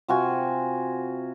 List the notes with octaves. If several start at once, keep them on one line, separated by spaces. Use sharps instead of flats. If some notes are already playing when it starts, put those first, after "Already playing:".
C3 F4 F#4 G#5